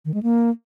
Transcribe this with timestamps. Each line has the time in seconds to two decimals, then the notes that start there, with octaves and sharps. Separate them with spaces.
0.05 D#3
0.14 G#3
0.23 A#3